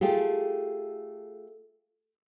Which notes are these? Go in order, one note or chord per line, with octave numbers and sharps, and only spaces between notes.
A3 F4 G4 G#4